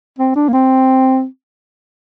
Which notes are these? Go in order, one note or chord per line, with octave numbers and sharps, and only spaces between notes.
C4
D4
A#3
C4